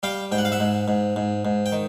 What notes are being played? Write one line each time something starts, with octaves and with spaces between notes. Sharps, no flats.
G3 F5 G5
G#2 G5
F#5
F5
E5 F#5
G#2
G#2
G#2
G#2
G5
D#3